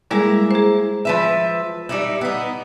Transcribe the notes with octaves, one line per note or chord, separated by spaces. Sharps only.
G3 G#3 A#3 E4 G#4 A#5
G#4 C5
F3 B4 E5
G3 D#4 E4
B3 D#4